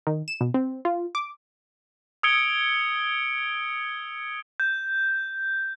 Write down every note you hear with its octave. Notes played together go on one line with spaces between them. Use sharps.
D#3
E7
B2
C4
F4
D6
D#6 E6 G#6 C#7 D7 G7
G6